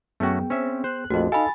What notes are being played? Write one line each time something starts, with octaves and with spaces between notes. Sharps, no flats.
F#2 A3 B3 C#4 F#4 G#4 G5
C4 C#4 E5
C5 F#6
A#1 F2 A3 F#4 D#5
D#4 A4 D#5 F5 G#5 B5 A6